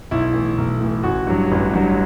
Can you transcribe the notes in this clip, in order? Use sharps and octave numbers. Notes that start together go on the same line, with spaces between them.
B1 E4
A2 E3
B1
A2 E3
A1 F#4
G2 F#3
A1
G2 F#3